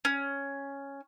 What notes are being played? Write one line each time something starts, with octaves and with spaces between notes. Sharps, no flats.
C#4